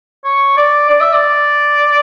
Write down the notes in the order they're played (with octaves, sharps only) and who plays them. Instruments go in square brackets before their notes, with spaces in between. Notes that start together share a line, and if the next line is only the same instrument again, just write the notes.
[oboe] C#5
D5
D5
E5
D5